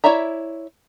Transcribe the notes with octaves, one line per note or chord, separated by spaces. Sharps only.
E4 C#5 D5 E5 A#5